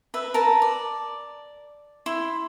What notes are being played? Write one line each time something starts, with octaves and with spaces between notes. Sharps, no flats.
B4 E5
A#4 B4 A5
D5
E4 C6